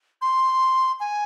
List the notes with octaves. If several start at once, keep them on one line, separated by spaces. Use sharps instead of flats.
C6
G#5